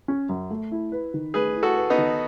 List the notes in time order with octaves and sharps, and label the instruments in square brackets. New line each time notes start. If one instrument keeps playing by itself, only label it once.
[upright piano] C#4
F#2
A3
E4
B4
D#3
[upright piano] A3 [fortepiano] G#4 B4
[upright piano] E4
[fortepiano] F#4 A4
[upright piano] B4
[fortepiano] B3 D#4
[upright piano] D#3